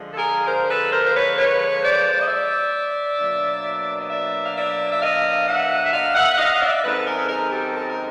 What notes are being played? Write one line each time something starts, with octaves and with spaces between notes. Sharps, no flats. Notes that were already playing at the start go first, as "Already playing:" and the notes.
Already playing: D3 F3 G#3
A4
G#4 A#4
A#4 C5
A4 B4
A#4 C5
C5
B4 C#5
B4 C#5
C5 D5
D5
D#5
D5 E5
B2 F#3 A#3 D4
D#5
D5 E5
F5
D5 E5
E5
D#5 F5
E5 F#5
E5
D#5 F5
E5 F#5
D#5 F5
D#5
D5 E5
F#2 D#3 G#3 C4 D#4 A4 B4
A4
G#4 A#4
A4
G#4 A#4
G4 A4
A4
A#4